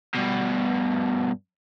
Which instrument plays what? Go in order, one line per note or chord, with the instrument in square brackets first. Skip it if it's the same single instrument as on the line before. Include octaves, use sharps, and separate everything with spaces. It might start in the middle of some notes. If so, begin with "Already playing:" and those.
[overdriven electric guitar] G2 B2